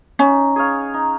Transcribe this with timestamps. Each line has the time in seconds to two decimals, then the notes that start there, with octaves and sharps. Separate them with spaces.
0.19 C#4 D#4
0.56 G#4 C#5 F5
0.94 D#4